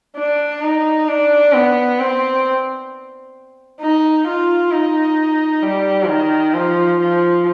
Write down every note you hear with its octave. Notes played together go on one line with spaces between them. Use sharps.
D4
D#4
D4
B3
C4
D#4
F4
D#4
G3
D#3
F3
F3